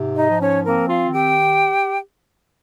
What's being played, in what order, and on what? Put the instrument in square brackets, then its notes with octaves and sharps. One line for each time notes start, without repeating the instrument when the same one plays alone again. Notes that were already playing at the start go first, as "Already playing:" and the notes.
Already playing: [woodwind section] G#2 C3
D#4 D#5
F3
C#4 C#5
A#3 C4 A#4
F4 F5
D#3
G4 G5